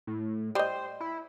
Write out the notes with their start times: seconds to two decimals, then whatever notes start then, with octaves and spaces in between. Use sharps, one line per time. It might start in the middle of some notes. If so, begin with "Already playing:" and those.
0.07 A2
0.55 G3 C5 D#5
1.00 E4